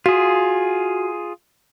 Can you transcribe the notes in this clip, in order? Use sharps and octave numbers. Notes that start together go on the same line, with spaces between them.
F4 F#4 G#4